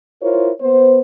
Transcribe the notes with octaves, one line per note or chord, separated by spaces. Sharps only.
E4 F4 A#4 C5 C#5
B3 C5